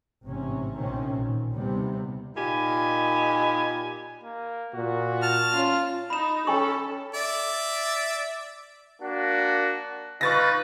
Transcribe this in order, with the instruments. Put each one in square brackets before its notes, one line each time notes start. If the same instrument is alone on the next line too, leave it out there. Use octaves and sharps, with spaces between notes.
[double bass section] A1 G#2 C3 C#4
A#1 C3 D#3 C4 C#4
A1 A#2
D#2 C3 G3 B3
[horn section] A#2 D#4 G4 G#5 B5
[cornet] A#3
[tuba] A#2 [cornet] F#4
[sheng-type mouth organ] A5 F6
[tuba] C#4 [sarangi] F4
[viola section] D#4 [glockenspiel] B5 E7
[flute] C#4 [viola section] A4 [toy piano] G5 G#5 C#6
[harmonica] D5 E5
[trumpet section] A#3 D4 F#4
[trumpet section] D#4 F4 B4 [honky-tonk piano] C#6 A6 A#6